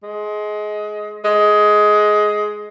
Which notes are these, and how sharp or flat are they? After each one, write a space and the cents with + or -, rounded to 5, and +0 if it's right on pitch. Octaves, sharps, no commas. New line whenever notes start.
G#3 +20
G#3 +15